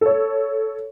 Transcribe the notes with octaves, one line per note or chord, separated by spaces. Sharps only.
A4 C#5